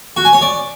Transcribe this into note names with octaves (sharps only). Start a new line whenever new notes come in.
F#4
G#5
C#5
D5